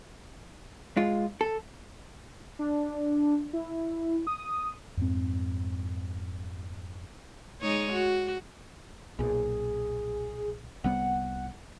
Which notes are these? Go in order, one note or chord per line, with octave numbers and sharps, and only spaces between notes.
G#3 F4
A4
D4
E4
D#6
F2 G#2 C4
G#3 D#4 C#5
F#4
B1 A#2 G#4
C2 G3 B3 F#5